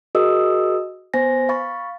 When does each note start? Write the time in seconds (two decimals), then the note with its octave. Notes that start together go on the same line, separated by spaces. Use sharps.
0.15 F#4 G#4 A#4 D#5 D#6 E6
1.14 B3 C5 G#5 A#6
1.49 F5 B5 C#6 A6